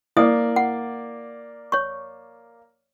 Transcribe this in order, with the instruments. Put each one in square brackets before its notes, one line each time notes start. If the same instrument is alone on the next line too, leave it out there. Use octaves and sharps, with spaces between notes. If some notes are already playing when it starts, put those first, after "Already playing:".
[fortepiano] A#3 D5 [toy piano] E4 C5 D#6
[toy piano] F#5
C#5 C#6